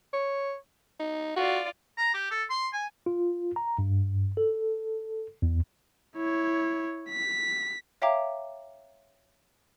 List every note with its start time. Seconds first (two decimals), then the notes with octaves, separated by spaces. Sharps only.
0.13 C#5
1.00 D#4
1.36 F4 F#4 D5
1.98 A#5
2.14 G4
2.31 A4
2.50 C6
2.73 G#5
3.06 F4
3.56 A#5
3.79 G2
4.37 A4
5.42 E2
6.16 E4 C#5
7.10 B6
8.02 C#5 E5 F5 G5 A#5 D6